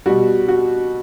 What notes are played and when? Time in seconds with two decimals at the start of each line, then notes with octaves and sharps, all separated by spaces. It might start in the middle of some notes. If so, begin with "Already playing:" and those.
0.06 B2 G3 F#4
0.48 F#4